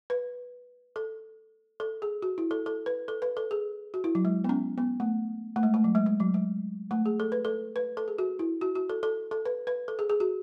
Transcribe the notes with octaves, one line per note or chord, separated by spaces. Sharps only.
B4
A4
A4
G#4
F#4
E4
A4
A4
B4
A4
B4
A4
G#4
F#4
E4
F#3
G#3
B3
C#4
B3
A3
A3
G#3
A3
F#3
G#3
G#3
F#3
G#3
A3
G#4
A4
B4
A4
B4
A4
G#4
F#4
E4
F#4
F#4
A4
A4
A4
B4
B4
A4
G#4
G#4
F#4